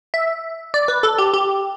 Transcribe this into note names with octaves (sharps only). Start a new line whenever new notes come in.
E5
D5
B4
A4
G4
G4